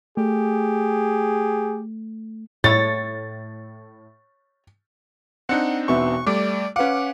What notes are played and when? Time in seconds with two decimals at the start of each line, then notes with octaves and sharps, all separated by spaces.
0.17 A3 G4 G#4
2.64 A2 C#5 A6
5.49 C4 D4 D#4 F#5 F#6 C#7
5.88 E1 B3 E5 C#6
6.27 G3 A3 D5 D6
6.76 C#4 B4 F5 F#5 D6